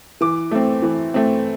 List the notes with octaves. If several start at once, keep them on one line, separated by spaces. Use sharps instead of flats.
E3 D6
A3 C4
E3
A3 C4